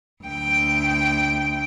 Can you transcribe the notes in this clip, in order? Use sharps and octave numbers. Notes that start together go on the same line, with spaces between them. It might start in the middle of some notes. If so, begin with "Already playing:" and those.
D2 G5